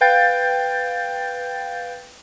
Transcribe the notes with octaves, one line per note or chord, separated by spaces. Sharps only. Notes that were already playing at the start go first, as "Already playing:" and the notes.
B4 F5 G5 G6 A6